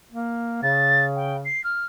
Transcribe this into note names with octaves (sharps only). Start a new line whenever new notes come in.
A#3
C#3 A6
G5
C7
F6